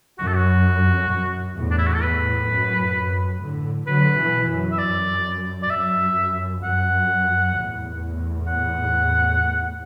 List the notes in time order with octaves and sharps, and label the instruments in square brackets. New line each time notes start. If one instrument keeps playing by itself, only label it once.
[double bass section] F#2 [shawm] F#4
[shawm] A4
F#4
[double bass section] F#2
E2 A2
[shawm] D4
E4
F#4
A4
[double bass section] E2 A2 [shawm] B4
[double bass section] F#2
F#2
A2 D3
[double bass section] D3 F#3 [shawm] B4
[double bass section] B2 E3
F#2
[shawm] E5
[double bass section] F#2 [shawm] D5
[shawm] D5
[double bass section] F#2 [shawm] E5
[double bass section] F#2 [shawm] F#5
[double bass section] E2 A2
[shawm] F#5